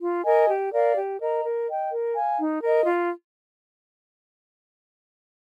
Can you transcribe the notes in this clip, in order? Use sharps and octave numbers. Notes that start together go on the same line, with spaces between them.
F4
A#4 D#5 G#5
G4
A#4 D5 F5
G4
A#4 D#5 A#5
A#4
D#5 G5
A#4
F5 G#5
D#4
A#4 D#5
F4